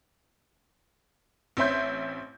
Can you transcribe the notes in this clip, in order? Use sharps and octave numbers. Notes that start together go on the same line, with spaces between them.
A1 C4 C#4 E5 C6 G6